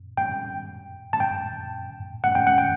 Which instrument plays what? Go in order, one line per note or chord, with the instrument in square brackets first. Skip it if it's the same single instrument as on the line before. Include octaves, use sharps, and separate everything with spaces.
[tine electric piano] G5
A5
G5
F#5
G5
F#5
G5